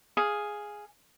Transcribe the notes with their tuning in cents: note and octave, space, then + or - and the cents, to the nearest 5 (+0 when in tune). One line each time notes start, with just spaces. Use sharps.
G#4 +0 F5 +0